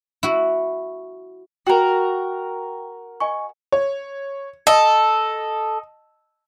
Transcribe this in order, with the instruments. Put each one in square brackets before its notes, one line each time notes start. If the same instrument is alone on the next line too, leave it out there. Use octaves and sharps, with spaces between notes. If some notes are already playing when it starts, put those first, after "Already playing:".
[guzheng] E4 F#4
[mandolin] F#4 A#4 [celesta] G5
[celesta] D#5 G#5 C#6
[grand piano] C#5
[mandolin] A4 [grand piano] D#5